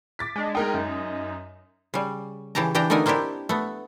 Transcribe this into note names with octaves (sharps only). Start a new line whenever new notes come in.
D6 A6 B6
G#3 D4
G#3 D#4 A#4 G5
F#2
C#3 G3
C#3 E3 G4 A5 A#5
E3 D4 G4 G5 A#5
D3 A3 B3 D#4 A#4 G#5
A#3 C4 D4 E4 G4
A3 B3